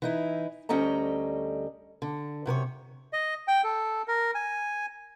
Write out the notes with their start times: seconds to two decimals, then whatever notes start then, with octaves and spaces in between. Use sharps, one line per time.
0.02 E3 D#4 E4
0.69 D2 G3 C#4 A4 D#5 A#5
2.02 D3
2.46 F#2 C3 A#4 C#5
3.13 D#5
3.48 G5
3.64 A4
4.08 A#4
4.35 G#5